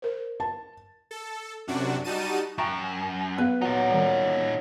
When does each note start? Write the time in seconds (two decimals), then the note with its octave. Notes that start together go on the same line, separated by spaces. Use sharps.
0.02 A#4 C5
0.40 A5
1.11 A4
1.67 F#2 C3 D4 F#4
2.04 G3 D#4 F#4 A5 D#7
2.58 F#2 G5 A5 A#5 C#6
3.38 B3 G#4 B4 F5
3.62 F#3 D#4 F4
3.90 D#3 G3